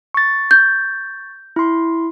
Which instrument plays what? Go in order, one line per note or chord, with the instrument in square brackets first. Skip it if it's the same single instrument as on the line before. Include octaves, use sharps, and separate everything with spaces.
[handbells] C#6 A6
[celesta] G6
[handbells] E4 C6